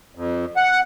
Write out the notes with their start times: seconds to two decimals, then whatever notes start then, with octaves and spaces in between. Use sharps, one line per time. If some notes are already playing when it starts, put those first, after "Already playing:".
0.15 F2
0.57 F#5